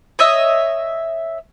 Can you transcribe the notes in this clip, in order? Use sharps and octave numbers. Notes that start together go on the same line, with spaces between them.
C#5 D#5 E5